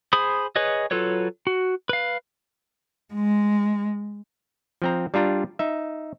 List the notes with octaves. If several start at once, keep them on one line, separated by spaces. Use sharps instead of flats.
G#4 C5 B5 D#6
G#4 B4 C#5 D#5
F#3 F4 A4 B4 C#5
F#4
B4 F5
G#3
F3 C4 A#5
G3 D4 F4 A#5
D#4 E5